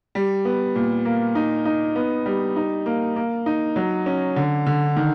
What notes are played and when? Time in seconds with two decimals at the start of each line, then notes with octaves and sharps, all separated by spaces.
0.15 G3
0.45 B3
0.75 A#2
1.05 A#3
1.35 D#4
1.65 D#4
1.96 B3
2.26 G3
2.56 D#4
2.86 A#3
3.16 A#3
3.46 D#4
3.76 F#3
4.06 C#4
4.36 D3
4.66 D3
4.96 D#3